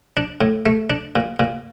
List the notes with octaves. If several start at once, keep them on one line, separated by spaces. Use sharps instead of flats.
D4
A2
A3
D4
A#2
A#2